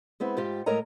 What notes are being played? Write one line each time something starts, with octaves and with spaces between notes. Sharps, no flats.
G#3 B3 C4 E4
G#2 F4 G4 G5
A2 G#3 A#4 C#5 D#5 A#5